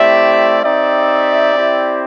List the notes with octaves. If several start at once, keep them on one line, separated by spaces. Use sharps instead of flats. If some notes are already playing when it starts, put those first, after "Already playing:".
Already playing: A3 C4 E4 G4 D5 E5
C4 D#4 G4 D5 E5
C4 E4 G4